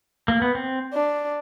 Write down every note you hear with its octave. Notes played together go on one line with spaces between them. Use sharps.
A#3
B3
C4
D4